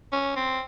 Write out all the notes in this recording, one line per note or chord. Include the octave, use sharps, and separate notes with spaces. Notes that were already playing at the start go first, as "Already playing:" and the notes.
C#4
C4